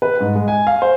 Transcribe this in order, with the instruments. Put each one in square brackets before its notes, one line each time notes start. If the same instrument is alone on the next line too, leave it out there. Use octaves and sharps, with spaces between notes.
[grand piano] B4
G#2
G#3
G#5
F5
C5